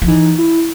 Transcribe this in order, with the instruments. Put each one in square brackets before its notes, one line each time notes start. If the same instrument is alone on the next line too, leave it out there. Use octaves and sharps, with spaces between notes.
[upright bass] F3
[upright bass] E3 [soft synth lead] D#4
[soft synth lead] E4